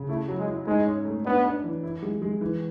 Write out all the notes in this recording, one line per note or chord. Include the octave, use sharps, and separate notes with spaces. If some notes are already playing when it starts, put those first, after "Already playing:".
Already playing: C#3
A3 E4
F#3
G#3
E4
G#2 G#3
C#4
A3
B3 D4
D4
E3
E4
G#3
G#3
E3